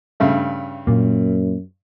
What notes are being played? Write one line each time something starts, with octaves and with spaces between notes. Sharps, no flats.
G2 C#3 A3
F#2 A#2 A#3